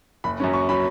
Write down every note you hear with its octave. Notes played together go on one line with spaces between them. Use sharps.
F#1 B5
F#2 F#3 C#4
F#1 C#6
F#3 C#4 B5